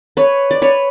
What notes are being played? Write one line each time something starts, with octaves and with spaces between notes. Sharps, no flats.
B4 C#5
D5
B4 C#5